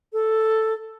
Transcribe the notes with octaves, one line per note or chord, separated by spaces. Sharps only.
A4